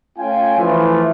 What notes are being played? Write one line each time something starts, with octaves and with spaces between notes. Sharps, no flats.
A3 C#4 F4 F5 G5 G#5
E3 F3 A3 F4